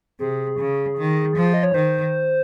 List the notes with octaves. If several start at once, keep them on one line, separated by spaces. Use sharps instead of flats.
C3 G#4
C#3
D#3
F3
D#5
C#5
D#3 C5